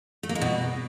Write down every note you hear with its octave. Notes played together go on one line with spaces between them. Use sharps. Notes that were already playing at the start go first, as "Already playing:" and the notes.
A3
A#3
G#3
B2